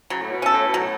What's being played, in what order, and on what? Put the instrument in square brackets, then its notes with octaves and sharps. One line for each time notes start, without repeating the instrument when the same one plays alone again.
[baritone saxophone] C#3 [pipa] F#3
[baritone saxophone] A2
B2
[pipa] C#4 A4
[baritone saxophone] A2
B2
[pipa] F#3
[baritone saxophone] A2